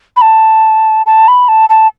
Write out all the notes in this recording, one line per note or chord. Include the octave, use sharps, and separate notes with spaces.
B5
A5
A5
B5
A5
A5